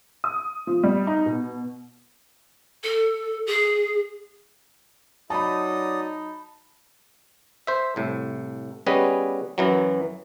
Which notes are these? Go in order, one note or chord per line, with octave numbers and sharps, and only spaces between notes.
D#6
F3
G3
D#4
B2
A4
G#4
F#3 D#4 D5 A5 B5 D#6
C5 E5
C2 A2
G3 B3 C#4 G#4 B4 D#5
F#2 E3 F#3